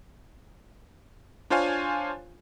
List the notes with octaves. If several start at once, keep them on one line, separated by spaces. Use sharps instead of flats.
D4 F4 C5 C#5 F5 G#5